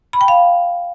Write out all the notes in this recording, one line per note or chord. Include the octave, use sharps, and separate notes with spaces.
B5
G5
F5